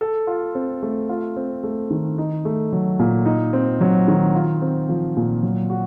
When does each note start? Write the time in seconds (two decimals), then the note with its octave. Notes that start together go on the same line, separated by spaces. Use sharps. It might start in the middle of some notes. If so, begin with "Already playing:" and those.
0.01 A4
0.27 F4
0.55 C4
0.83 A3
1.09 F4
1.36 C4
1.64 A3
1.91 D#3
2.18 D#4
2.45 A3
2.73 F#3
2.99 A#2
3.26 D#4
3.53 C4
3.81 F#3
4.08 D#3
4.35 F4
4.62 C4
4.89 F3
5.17 A#2
5.43 F#3
5.70 F#4